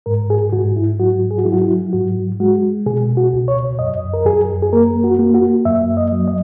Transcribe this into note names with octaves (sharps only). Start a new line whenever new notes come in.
G#2 A#4
G#4
G#2 F#4
E4
F#3 F#4
G#4
F#4
F#3 E4
F#4
E4
G#2 F#4
G#3 F#4
B2 G#4
F#4
C#2
C#5
F#2 D#5
A#4
F#2 G#4
G#4
A#3 A#4
F#4
A#3
F#4
F#2 E5
D#5
F#3
D#5